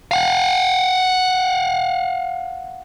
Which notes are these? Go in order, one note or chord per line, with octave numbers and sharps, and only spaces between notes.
F5 F#5